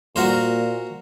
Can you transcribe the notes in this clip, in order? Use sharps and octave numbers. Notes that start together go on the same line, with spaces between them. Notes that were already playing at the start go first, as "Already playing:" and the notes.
A#2 F#4 A#4 C5